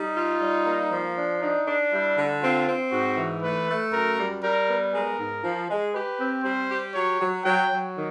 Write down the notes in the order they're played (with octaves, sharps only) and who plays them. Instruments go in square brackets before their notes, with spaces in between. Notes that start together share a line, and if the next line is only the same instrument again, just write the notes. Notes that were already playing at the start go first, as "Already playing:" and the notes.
Already playing: [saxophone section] G3 [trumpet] D#4
[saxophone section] F4
G3
A#3
F3
D4
[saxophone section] D4 [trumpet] D#4
[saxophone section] D4
[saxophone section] G3 [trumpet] E4
[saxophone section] D3
[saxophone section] C4 [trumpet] F4
[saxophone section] C4
[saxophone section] G#2 [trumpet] F#4
[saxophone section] E3
[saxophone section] A3 [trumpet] B4
[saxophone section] A3
[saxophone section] F#2 [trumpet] A#4
[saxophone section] G3
[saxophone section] G3 [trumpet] A#4
[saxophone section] B3
[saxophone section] G#3 [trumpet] A#4
[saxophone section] G#2
F3
G#3
[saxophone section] G4 [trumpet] B4
[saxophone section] C4
[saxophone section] G3 [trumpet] C5
[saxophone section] G4
[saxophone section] F#3 [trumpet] C#5
[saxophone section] F#3
[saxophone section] F#3 [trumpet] G5
[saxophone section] F#3
D#3